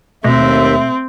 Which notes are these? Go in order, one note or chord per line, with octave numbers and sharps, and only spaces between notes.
D#2 B2 A3 C4 E5